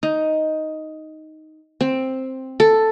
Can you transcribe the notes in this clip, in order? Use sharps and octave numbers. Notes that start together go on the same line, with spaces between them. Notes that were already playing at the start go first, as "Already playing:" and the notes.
D#4
C4
A4